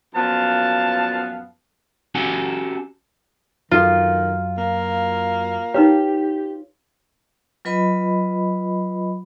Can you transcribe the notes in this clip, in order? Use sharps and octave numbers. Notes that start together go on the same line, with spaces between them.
F#2 A#2 F3 B3 F5 A5
C#4 F#4 G4 A4 F#5 G#5
F#2 D#3 F4 A4 B4
A#3
D#4 G4 B4 C#5
F#3 F4 B4 D#5 B5